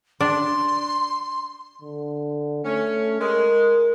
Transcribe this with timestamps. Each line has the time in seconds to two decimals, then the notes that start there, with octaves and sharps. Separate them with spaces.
0.21 D4 C6
1.82 D3
2.65 A3 C#4
3.21 G#3 A#4